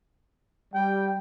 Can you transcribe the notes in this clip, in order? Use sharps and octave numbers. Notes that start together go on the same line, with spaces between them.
G3 G5